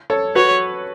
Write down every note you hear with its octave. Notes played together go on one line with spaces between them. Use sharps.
A4 C#5
F#4 B4 C#5